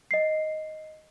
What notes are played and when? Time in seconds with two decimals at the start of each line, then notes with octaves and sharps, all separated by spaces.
0.11 D#5 C7